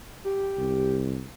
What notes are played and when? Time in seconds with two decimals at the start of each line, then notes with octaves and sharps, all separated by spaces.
0.24 G4
0.57 C2